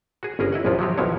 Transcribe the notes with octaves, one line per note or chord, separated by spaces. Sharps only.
F#4 G#4
G1 C#4 G#4 A#4
E4 D#5 F#5
A#1 F#2 F3 E4 F4
F3 F#3 F#4 G4
B1 B2 D#3 F3 E4 C#5